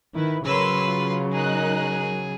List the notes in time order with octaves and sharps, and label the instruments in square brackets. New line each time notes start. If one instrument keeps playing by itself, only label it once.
[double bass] D#3 [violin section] E4 B4
[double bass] C#3 F#3 [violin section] A#4 C#5 E6 [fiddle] B4 C6
[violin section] F4
[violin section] D#4 A#4 F#6 [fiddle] G#4